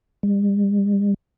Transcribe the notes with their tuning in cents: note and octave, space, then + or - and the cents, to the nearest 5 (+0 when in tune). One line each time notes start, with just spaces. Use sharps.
G3 +45